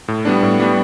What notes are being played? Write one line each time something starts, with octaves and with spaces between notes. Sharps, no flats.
A2
G3 B3 D4
A2
G3 B3 D4